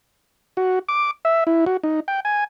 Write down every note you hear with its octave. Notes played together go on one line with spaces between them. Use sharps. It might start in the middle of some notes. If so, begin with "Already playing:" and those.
F#4
D6
E5
E4
F#4
D#4
G5
G#5